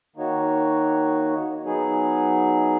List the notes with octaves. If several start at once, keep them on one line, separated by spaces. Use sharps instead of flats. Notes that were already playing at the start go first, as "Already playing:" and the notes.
D#3 A#3 D#4 F#4 C#5
F#3 B3 D#4 G#4